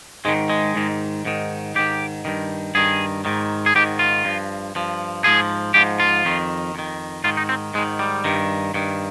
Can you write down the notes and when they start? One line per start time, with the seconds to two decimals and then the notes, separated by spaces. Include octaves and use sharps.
0.25 G#2 D#3 G#3
0.50 G#3
0.75 G#2 D#3
1.25 G#2 D#3
1.75 G#2 D#3 G4
2.25 G2 D#3
2.75 G2 D#3 G#4
3.25 G#2 D#3
3.66 G#4
3.75 G#2 D#3 G4
3.99 F4
4.25 G2 F3
4.75 G2 F3
5.24 G#2 F3 G#4
5.74 G#2 F3 G4
6.00 F4
6.25 F2 D#3
6.75 F2 D#3
7.24 G#2 D#3 F4
7.37 D#4
7.49 C4
7.74 G#2 G#3
7.78 D#3
7.99 G3
8.24 G2 D#3
8.74 G2 D#3